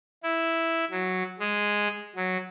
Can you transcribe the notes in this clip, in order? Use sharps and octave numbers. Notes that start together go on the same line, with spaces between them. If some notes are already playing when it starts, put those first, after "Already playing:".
E4
F#3
G#3
F#3